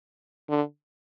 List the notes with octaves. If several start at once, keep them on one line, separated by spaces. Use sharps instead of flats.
D3